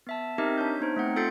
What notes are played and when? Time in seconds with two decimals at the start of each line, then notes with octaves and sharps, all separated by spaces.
0.07 B3 E5 A5
0.38 C4 D#4 G4 A#4 D#5 E5
0.58 D4 C#5 G6
0.81 B3 D#4 C5
0.96 A3 C4 F#5
1.16 F4 A4 G6 A6 C7 C#7